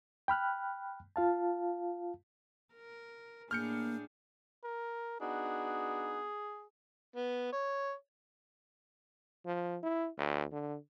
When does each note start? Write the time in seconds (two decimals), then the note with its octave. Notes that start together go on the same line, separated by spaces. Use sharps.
0.28 G5 B5 F6 F#6
1.16 F4 F5 A5
2.74 A#4
3.51 A2 A#3 D4 G#4 F6 G6 C#7
4.64 A#4
5.21 B3 D4 D#4 F#4 G#4
7.16 B3
7.53 C#5
9.46 F3
9.83 E4
10.18 D2
10.52 D3